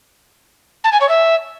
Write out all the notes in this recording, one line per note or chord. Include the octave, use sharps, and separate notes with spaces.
A5
G#5
C#5
E5